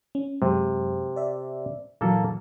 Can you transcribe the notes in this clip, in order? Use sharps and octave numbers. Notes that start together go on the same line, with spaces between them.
C#4
F#2 C3 F#3 G#3
D5 E5
A#2 E3 F#3 A#3 A4